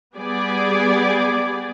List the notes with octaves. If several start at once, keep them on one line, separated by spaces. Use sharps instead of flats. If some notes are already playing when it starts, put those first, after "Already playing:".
G3 B3 G4 G#4 D5